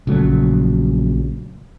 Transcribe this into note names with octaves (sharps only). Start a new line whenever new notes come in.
A#1 C#3 F#3 A3